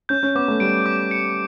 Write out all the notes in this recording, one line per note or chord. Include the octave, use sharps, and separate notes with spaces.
C#4 G6
C#4
B3 D6
A3
G3 D7
D6
C#7